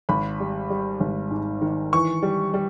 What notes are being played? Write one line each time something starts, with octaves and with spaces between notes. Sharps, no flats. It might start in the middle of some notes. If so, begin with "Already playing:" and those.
G#1 B5
G3
G3
G#1
G#2
D#3
E3 C#6
G3
G3